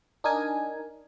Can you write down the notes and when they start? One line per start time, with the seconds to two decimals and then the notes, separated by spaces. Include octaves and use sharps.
0.24 D4 D#4 A#4 G#5